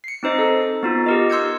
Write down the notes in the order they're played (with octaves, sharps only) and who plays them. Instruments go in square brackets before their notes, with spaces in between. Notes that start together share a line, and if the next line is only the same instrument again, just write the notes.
[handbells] C7 C#7
C4 D#4 C5 D#5
A4
B3 D#4 F4
G4 A#4 D#5
C6 E6 G6 G#6 C#7